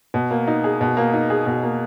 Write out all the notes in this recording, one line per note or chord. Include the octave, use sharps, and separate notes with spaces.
B2
A#3
D#4
G#4
B2
A#3
D#4
G#4
B2
A#3